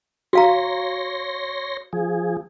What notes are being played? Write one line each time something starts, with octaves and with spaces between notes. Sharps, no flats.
F#4 C#5 F5 A#5 C6 A#6
F3 G#4